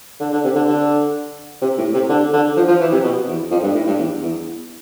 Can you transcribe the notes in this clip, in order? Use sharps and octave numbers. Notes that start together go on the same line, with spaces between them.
D3
D3
C3
D3
D3
C3
A2
C3
D3
D3
F3
F3
E3
C3
B2
E2
F2
G2
A2
G2
E2
E2